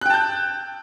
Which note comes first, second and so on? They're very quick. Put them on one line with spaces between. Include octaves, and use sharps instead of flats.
F#6 G5 A5 G6